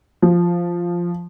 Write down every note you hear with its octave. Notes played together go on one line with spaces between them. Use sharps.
F3